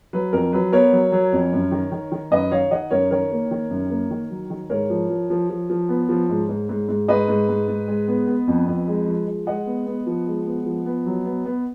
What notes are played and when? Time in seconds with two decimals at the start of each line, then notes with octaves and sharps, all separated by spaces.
0.13 F#3 B4
0.33 F2 A#4
0.53 F#3 B4
0.72 B3 A#4 C#5
0.92 F#3
1.12 F#3
1.32 F2
1.52 F#2
1.71 D#3
1.92 D#3
2.12 D#3
2.31 F#2 B4 D#5
2.51 D#3 C#5 F5
2.71 D#3 D#5 F#5
2.91 F#2 A#4 C#5
3.11 D#3 A#4 C#5
3.31 A#3
3.51 D#3
3.70 F#2
3.90 A#3
4.11 D#3
4.30 F#3
4.50 D#3
4.69 G#2 A#4 C#5
4.90 F3
5.10 F3
5.30 F3
5.50 F3
5.70 F3
5.89 B3
6.09 F3
6.29 G#2
6.49 G#2
6.69 G#2
6.89 G#2
7.08 G#2 B4 D#5
7.28 G#2
7.49 G#2
7.68 G#2
7.88 G#3
8.08 B3
8.27 B3
8.47 F2
8.67 F2
8.87 G#3
9.07 F3
9.27 G#3
9.47 G#3 D#5 F#5
9.66 B3
9.86 B3
10.07 F3
10.27 G#3
10.46 B3
10.66 F3
10.86 B3
11.06 F#3
11.26 B3
11.45 B3